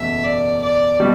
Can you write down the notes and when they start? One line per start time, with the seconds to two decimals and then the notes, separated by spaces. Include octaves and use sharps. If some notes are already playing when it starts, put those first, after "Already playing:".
Already playing: F#1 E2 B2 A3 E5
0.24 D5
0.61 D5
1.00 B2 G3